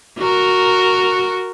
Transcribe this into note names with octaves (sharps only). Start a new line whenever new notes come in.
F#4 A#4